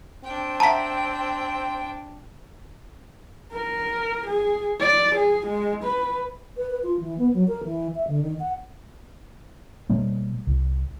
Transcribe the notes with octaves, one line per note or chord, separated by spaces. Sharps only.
C4 D4 G5
E5 F#5 A5 A#5 B6
A#4
G#4
D5
G#4
G#3
B4
B4
B4
F4
E3
B3
F#3
A#4
E3
E5
D3
D#3
F#5
B2 G3 A#3
C2